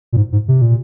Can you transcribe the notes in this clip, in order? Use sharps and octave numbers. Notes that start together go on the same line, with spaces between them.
A#2
G#2
G#2
C3
A#2